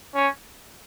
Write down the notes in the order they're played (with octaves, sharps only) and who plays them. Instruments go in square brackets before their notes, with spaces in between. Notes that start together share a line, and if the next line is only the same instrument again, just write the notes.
[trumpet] C#4